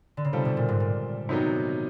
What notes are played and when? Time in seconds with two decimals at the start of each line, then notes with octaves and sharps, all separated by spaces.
0.17 D3
0.25 C#3
0.33 C3 D#3 G3 C4 F4 A4
0.45 B2
0.57 A#2
0.69 G#2
0.80 A#2
1.29 C3 D#3 F#3 B3 D#4